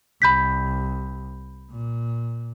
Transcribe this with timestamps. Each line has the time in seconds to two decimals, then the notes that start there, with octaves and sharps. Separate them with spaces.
0.22 C2 B5 G6 B6
1.70 A#2